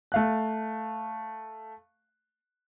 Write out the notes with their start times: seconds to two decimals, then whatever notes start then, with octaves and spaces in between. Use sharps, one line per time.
0.12 A3 F5 F#6